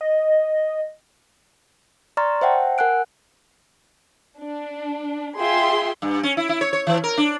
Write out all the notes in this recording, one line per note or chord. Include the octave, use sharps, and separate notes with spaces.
D#5
D5 A#5 C6 C#6 F6 A6
C5 E5 F#5 G5 A5
A#4 F#5 G#5 F#6 D7
D4
F4 G#4 E5 G5 C6
G2
C#4
E4
E4
C#5
C#5
E3
A#4
D4